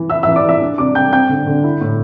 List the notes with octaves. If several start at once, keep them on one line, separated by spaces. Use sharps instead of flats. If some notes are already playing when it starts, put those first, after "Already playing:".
Already playing: E3
E4 E5 E6
E5 E6
E3
D5 D6
E3 E5 E6
D4
C3 D5 D6
C3 G5 G6
C4 G5 G6
D3
D3
E4
A2